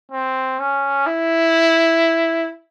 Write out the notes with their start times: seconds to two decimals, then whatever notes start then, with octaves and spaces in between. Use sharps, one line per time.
0.12 C4
0.60 C#4
1.06 E4